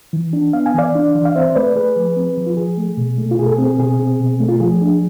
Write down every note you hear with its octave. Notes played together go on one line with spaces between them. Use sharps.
E3
D4
B3 F5
G#5
E3 D5 F5
D4
E3
F5
C4 C5 E5
C5
A3 B4 D5
A3 G#4 B4
F3
C4
F3
F4
F3 G#4
A3
B2
A3
F4
B2 G#4
A4
G#4
C4
G#4
B2 G#4
C4
B2
A3
F4
F3 G#4
D4